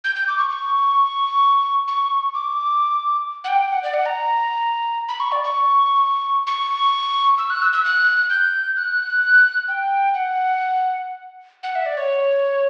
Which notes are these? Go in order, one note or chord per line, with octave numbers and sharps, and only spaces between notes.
G6
G6
D6
C#6
C#6
C#6
D6
F#5
G5
F#5
D5
F#5
A#5
B5
C#6
D5
C#6
C#6
E6
F#6
E6
E6
F#6
G6
F#6
G5
F#5
F#5
E5
D5
C#5